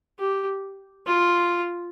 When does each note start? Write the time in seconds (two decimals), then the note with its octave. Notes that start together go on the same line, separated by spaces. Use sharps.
0.19 G4
1.07 F4